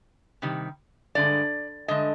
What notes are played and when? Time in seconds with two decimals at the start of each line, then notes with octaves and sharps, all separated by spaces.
0.42 C3 D#3 G3
1.15 G2 D3 G#3 D5
1.88 G2 D3 G#3 D#5